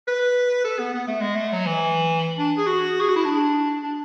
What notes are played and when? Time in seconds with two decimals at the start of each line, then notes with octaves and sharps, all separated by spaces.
0.08 B4
0.65 A4
0.79 B3
0.94 B3
1.07 A3
1.21 G#3
1.35 A3
1.53 F#3
1.67 E3
2.38 D4
2.57 G#4
2.67 F#4
3.01 G#4
3.09 F#4
3.16 E4
3.25 D4
3.83 D4